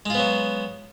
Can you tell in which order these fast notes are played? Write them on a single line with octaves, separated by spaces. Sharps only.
G#3 F4 B3 F#3